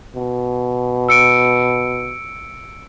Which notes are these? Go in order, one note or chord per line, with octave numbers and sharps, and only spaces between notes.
B2
E6 C#7 D7